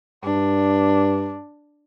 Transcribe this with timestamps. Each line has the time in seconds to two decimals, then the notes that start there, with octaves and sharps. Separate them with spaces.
0.24 G2 D4